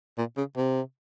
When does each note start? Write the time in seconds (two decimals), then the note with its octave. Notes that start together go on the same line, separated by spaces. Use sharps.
0.18 A#2
0.37 C#3
0.57 C3